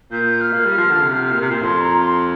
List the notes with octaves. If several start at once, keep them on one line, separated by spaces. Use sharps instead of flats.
A#2 G6
F6
A#3
G3
F3
D3
C3
A#2
C3
A#2
F2 C6
A#5
C6